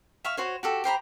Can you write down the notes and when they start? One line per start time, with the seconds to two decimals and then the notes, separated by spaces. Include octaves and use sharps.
0.25 E5 F5 C#6
0.37 F#4 C5 C#5
0.63 F#4 G4 A4
0.84 G4 C5 A#5 B5